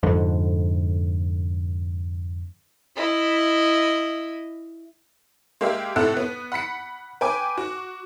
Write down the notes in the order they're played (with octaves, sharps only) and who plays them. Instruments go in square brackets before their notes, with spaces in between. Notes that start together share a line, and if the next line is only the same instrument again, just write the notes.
[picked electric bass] F2 G#2 D3
[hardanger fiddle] E4 D#5
[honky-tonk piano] G#3 A#3 G4 E5
A2 C3 E4 A4 F#5 F#6
B3
F#5 B5 B6 C#7
B4 G5 G#5 D6
F#4